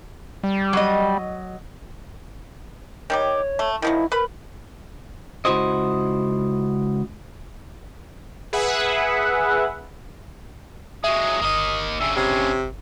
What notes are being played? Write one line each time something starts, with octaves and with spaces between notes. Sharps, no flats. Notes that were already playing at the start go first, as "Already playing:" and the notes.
G3
F#3 D#5
D#3 G3 G4 C#5
A3
D#3 F3 F#3 E4
A#4 B4 B5
C#2 E4 F#4 C5 D#5
G#4 B4 E5 F#5
F#3 G#3 E5 D#6
G1 A#3 D#5
G2 C#3 E5
C3 C#5